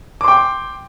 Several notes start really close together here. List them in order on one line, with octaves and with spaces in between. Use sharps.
D6 C6 G5